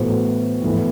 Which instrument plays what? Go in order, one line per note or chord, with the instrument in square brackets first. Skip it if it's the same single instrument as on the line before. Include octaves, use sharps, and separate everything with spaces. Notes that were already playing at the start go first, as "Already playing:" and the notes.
Already playing: [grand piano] A2 E3 B3 F#4 C5
A2 E3 B3